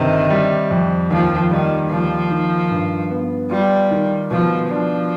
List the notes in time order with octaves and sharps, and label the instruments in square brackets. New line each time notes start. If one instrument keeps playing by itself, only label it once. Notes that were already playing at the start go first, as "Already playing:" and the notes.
Already playing: [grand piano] G1 C3 [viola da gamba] D#3
[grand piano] G3
F2
[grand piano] D#2 [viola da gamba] F3
[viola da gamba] D#3 [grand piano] G3
[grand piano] D#2 [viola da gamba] F3
[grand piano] D#3
G2
B3
[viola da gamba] G3 [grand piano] F4
[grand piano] D#3
[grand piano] B2 [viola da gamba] F3
[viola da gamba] F3 [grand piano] D4